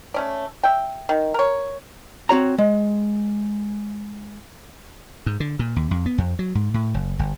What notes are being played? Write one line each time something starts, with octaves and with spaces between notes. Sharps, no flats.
A3 C#4 D5
E5 G5
D#3
A#4 C#5
C4 F#4 C#5 A#5
G#3
G#2
D3
A#2
D#2
F2
B3
F2
F#3
G#2
A2
F#1
G1